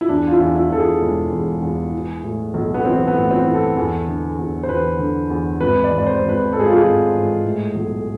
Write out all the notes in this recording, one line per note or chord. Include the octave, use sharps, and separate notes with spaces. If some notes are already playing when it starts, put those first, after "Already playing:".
E4
E2 D4
F4
E4
E2
E4
E2 A4
G#4
E1
E2
E2
E3
A2
B1
B3
E3 C4
B3
A2
C4
E3
A4
E2
D3
E2
C5
E2 B4
D3
E2
G#1 B4
D5
G#1
D5
C5
G#1
B4
G#2 A4
G#4
F4
G#4
G#1
G#2
A2
B1